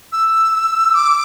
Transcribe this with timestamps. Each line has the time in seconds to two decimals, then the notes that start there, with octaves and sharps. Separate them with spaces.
0.13 E6
0.94 D6